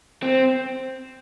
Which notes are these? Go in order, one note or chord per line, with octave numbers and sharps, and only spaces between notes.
C4